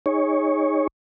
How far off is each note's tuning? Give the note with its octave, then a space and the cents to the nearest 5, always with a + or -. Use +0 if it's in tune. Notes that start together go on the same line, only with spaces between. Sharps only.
D#4 +0 G#4 -20 C#5 +0